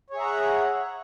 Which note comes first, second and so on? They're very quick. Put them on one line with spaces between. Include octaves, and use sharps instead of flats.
C#5 G#4 E5 A#5 F#5